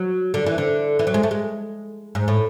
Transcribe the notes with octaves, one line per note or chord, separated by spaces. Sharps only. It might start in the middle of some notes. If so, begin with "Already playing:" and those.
Already playing: F#3
D3
E3
D3
E3
F#3
G#3
A3
G#3
G#2
A2